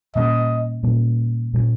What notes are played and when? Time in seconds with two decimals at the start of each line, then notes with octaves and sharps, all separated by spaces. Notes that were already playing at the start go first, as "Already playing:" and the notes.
0.15 A#2 G3 A#3 C#4 D#5
0.83 A#2 G3 A#3 C#4
1.53 A#2 G3 A#3 C#4